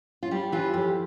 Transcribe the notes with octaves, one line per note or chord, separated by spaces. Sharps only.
F4
G3 G4
E3 F4
F2 G4